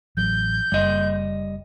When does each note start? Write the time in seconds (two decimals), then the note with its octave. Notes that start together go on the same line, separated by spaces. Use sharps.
0.17 A1 F#3 G6
0.72 F#1 G3 D#5